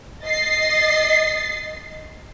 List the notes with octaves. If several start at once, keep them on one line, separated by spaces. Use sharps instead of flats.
D#5 A6 C7